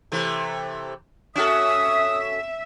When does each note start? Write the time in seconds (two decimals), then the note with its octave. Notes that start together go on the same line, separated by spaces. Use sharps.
0.12 C3 E3 A3
1.36 C#4 F#4 A4 E5 D#6